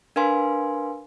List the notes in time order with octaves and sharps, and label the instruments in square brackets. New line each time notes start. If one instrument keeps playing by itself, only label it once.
[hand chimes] D4 A#4 B4 F5 G#5 C6